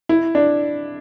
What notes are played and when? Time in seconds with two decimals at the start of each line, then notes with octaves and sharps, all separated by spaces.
0.09 E4
0.35 D4